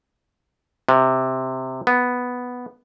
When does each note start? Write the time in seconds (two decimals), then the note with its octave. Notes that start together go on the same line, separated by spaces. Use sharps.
0.89 C3
1.87 B3